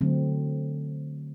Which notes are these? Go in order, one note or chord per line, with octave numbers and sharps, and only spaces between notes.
D3 F#3 A3 C4